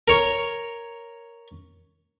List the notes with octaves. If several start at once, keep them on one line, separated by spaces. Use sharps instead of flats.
A#4 C#5